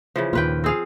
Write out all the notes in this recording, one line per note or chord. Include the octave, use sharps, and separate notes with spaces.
C#3 E3 F3
D#2 A#2 F4 B4 G5
C4 G#4 F5